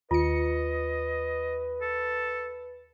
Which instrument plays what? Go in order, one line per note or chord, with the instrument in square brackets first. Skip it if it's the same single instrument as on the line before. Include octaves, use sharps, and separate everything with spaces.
[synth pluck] D#2 C#7 [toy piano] F4 [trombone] B4 [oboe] D#5
[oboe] A4